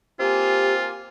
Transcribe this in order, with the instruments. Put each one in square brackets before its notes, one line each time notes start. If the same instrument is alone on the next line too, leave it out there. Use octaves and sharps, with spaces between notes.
[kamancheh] A#3 G#5 [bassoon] C4 [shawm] F4 [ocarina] G4